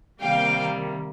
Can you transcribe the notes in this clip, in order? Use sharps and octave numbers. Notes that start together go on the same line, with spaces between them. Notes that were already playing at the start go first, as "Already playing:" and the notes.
C3 D#3 G3 A#3 F5 G5